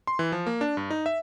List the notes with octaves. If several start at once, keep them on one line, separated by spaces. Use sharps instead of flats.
C6
E3
F3
A#3
D4
G2
D#4
E5